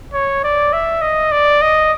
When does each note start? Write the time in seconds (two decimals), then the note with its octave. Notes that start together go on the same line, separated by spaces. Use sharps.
0.14 C#5
0.44 D5
0.73 E5
1.02 D#5
1.32 D5
1.62 D#5